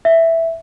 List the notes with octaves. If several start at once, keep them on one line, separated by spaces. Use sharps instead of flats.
E5